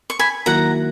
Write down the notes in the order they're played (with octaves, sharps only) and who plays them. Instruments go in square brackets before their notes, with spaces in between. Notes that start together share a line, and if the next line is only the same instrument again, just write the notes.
[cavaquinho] C#6
G#5 B5
[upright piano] D#3 F#3 A#3 E4 [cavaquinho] F#5 A#5